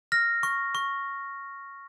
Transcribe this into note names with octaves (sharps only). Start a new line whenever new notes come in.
F6 A#6
C#6
C#6